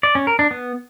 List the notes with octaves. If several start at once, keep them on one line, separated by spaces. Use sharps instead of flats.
D5
C#4
A#4
D4
B3